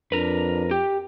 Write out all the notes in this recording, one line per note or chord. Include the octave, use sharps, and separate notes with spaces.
F2 D4 A#4 B4
G4 G5